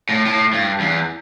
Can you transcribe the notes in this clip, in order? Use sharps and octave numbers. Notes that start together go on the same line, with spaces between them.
A2
A2
G2
E2